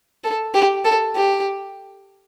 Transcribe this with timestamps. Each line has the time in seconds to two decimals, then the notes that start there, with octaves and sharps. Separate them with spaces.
0.24 A4
0.54 G4
0.84 A4
1.15 G4